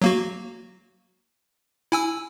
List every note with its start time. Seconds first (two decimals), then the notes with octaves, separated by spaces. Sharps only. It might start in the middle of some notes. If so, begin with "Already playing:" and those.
0.02 F#3 A#3 F#4
1.92 E4 G#5 E6